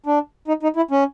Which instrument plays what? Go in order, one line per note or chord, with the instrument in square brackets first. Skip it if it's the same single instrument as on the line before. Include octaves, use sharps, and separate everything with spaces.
[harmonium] D4
D#4
D#4
E4
C#4